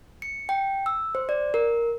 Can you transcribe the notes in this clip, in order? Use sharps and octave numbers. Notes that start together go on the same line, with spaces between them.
C#7
G5
E6
C5
D5
A#4